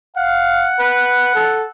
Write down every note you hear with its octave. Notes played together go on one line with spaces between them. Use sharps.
F5 F#5
B4
A4